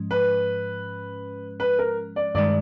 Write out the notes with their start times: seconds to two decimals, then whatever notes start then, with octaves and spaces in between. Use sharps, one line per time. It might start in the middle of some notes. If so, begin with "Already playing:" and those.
Already playing: G#2 F3 G#3 C#4
0.11 B4
1.60 B4
1.79 A#4
2.16 D5
2.35 G2 D#3 G#3 D5